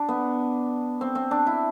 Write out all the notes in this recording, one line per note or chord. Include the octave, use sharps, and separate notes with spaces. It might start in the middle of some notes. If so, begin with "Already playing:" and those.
Already playing: D4
B3
C4
C4
D4
E4